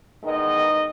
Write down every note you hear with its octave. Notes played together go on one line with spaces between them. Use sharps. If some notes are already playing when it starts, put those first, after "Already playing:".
E2 D#3 G#3 B3 D#4 D#5